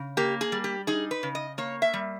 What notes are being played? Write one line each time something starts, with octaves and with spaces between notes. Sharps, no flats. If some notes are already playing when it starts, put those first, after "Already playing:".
Already playing: C#3
A#3 G4
G#4
G3
G4
D#4 G#4
B4
C#3
D#5
A#3 C#5
E5
G3